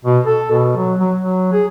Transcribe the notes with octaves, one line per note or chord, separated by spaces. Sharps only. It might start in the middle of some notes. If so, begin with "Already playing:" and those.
B2
A4
B2
F#3
F#3
F#3
G#4